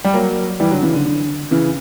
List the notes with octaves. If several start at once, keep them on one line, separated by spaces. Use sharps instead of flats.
G3
F#3 A#3
E3 G3
D3 F#3
C#3 E3
D3
D3
C#3 E3